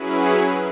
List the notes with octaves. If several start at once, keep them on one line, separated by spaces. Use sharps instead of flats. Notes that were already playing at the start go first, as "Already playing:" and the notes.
Already playing: F#3 C#4 E4 G#4 B4